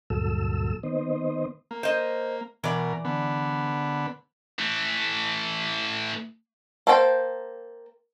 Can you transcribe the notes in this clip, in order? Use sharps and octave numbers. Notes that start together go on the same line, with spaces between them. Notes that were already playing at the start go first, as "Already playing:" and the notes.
D2 G2 A#2 F#3 A4 E6
D#3 B3 C5 D#5
A#3
C5 D#5
B2 E3 A#4 D5
D3 B3
E3 A3
A#3 A4 C5 C#5 G5